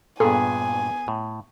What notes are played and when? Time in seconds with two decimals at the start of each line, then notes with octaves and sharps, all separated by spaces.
0.20 G2 A#2 B3 G#4 A4 G#5
1.08 A2